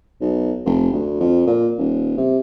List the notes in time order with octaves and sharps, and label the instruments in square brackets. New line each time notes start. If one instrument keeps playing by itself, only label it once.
[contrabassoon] B1
F1
D2
F2
A#2
D#1
C3